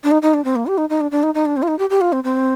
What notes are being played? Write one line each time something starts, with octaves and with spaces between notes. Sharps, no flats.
D4
D#4
D#4
D4
C4
A#3
G4
D#4
D#4
D4
D4
D#4
D#4
D4
C4
F4
D#4
G4
G4
F4
C4
C4